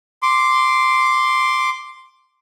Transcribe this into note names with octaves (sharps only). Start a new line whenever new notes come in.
C6 D6